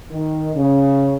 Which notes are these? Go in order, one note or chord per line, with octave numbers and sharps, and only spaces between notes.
D#3
C#3